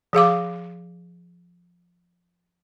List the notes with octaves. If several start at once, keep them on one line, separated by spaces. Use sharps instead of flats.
F3 G#4 F5 D6